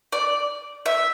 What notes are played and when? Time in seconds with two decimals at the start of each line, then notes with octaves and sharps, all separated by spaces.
0.12 D5
0.86 E5